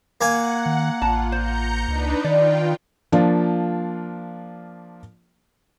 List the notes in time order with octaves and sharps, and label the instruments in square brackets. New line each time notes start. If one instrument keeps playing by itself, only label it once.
[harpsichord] A#3 G#5 [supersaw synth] F#5
[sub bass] D#3
[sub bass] A1 [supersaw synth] F4 [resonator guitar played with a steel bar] A5 A#5
[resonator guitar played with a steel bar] C5 [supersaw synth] A#5 G6 C#7
[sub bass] C#2 [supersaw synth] D4 D#4 B4
[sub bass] D#3 [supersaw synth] F4 G5 [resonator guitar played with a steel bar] D5
[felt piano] F3 A#3 D4 F4